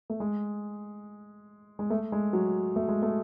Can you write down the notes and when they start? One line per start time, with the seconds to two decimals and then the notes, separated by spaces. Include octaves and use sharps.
0.10 A3
0.20 G#3
1.79 G#3
1.90 A3
2.12 G#3
2.33 F#3
2.76 A3
2.88 G#3
3.02 A3